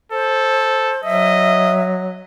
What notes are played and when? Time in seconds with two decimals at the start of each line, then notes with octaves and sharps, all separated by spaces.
0.12 A4 C5
1.04 F#3 D#5 E5